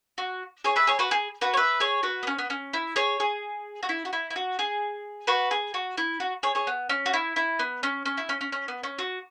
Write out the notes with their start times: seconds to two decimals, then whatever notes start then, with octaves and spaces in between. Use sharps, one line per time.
0.18 F#4
0.64 G#4 C#5
0.76 B4 E5
0.87 G#4 C#5
0.99 F#4 B4
1.11 G#4
1.41 F#4 B4
1.54 C#5
1.57 B4 E5
1.80 G#4 C#5
2.03 F#4 B4
2.23 B3
2.27 C#4
2.38 B3
2.50 C#4
2.73 E4
2.96 G#4 C#5
3.20 G#4
3.83 F#4
3.89 E4
4.05 F#4
4.13 E4
4.30 E4
4.36 F#4
4.59 G#4
5.27 F#4 B4
5.51 G#4
5.74 F#4
5.98 E4
6.20 F#4
6.43 G#4 C#5
6.55 G#4 C#5
6.67 B3
6.89 C#4
7.06 F#4
7.13 E4
7.36 E4
7.59 B3
7.83 C#4
8.06 C#4
8.17 E4
8.29 C#4
8.41 C#4
8.52 C#4
8.68 B3
8.83 C#4
8.99 F#4